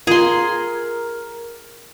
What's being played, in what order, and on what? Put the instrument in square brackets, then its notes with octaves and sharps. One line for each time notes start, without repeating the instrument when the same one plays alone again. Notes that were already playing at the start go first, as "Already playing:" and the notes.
[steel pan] F4 [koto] G#4 [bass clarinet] A#4 [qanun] A#5 C6